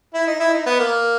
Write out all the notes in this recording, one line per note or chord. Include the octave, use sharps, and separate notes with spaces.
E4
D#4
E4
D#4
B3
A#3